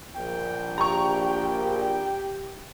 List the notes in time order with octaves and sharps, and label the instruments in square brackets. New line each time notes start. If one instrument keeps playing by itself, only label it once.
[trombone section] A#1 A#2 [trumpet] G5
[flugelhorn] G4 [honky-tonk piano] A#5 C#6